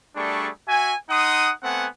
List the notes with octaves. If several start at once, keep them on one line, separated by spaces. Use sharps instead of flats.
G3 A3 D4 G#4 C#6
F#4 E5 G#5
D#4 F#5 C6 D#6
A3 B3 C4 F#5 G#5